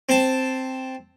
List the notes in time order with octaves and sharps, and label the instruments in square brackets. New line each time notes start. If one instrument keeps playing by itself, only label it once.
[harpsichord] C4 A5